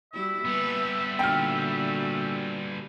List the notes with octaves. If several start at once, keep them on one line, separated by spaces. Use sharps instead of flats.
G3 E4 F#4 E5
G3 A#3 B3 B4
A#2 D3 F#4 G5 F6